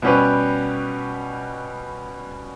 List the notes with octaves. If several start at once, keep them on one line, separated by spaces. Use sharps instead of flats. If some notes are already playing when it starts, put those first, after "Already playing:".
B2 G3 C#4 G4 B4